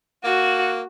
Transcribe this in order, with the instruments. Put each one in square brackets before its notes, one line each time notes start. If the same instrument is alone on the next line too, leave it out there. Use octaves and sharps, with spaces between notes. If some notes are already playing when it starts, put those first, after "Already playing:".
[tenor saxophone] A#3 [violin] F#4